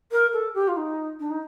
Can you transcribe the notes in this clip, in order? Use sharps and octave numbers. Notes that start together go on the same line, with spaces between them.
A#4
A4
G4
F4
D#4
D4
D#4